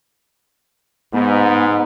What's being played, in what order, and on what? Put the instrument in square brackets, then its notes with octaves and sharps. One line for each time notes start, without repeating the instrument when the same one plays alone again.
[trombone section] G#2 [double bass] B3